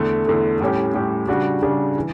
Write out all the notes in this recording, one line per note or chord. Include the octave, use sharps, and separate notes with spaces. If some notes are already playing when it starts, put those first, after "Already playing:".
Already playing: E2 D3 A3
E2 D3 A3
A2 G3 C#4 G4
A2 G3 C#4 G4
C#3 G3 D4 F#4
C#3 G3 D4 F#4
E3